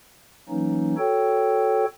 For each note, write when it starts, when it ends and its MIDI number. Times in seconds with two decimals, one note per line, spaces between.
0.49 0.95 52
0.49 0.95 54
0.49 0.95 58
0.49 0.95 61
0.49 0.95 63
0.98 1.85 66
0.98 1.85 69
0.98 1.85 73
0.98 1.85 79